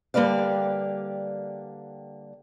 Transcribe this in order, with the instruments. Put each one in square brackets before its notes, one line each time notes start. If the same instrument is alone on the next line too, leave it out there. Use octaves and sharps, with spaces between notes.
[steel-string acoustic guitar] D3 G3 A#3 B4 D5 F5